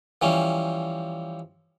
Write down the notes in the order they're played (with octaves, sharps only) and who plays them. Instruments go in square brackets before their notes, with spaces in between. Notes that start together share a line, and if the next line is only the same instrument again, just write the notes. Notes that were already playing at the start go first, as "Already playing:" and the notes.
[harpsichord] E3 F3 G3 C#4